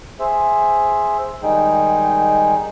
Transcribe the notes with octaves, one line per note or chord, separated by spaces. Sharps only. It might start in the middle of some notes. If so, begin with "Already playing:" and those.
G#4 C5 E5
D#3 G3 G#3 D#4 G#4 G5